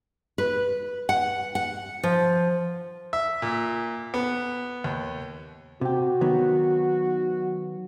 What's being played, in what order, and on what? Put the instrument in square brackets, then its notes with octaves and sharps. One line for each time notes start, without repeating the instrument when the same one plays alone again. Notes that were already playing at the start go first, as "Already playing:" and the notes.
[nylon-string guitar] B4
F#5
F#5
F3
[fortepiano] E5
A#2
B3
D#2
[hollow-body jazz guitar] C3 G4 [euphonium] F#4
[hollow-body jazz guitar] D#3 F#3 B3